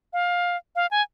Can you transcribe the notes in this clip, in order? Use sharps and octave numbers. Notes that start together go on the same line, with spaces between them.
F5
F5
G#5